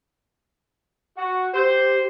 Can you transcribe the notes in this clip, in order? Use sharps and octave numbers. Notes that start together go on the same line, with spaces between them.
F#4
G4 C5